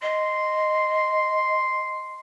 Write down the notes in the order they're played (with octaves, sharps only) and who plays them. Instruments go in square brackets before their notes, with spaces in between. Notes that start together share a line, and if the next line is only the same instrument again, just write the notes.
[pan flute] D#5 [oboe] C6